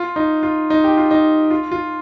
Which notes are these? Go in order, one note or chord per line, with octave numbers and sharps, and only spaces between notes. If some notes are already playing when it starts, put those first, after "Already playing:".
Already playing: F4
D#4
F4
D#4
G4
F4
D#4
F4
F4